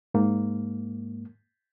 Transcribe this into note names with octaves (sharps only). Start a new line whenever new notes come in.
G#2 A#3